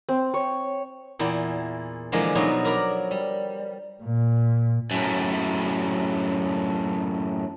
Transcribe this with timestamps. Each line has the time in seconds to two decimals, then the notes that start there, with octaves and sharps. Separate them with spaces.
0.09 C4
0.34 C#5
1.19 E2 A#2 E4 G5
2.12 D3 E3 F3 G#3 A#3
2.35 B2 F3 F#3 D#4
2.65 A#4 D5 A#5 B5
3.11 G3
4.03 A#2
4.91 F#2 A2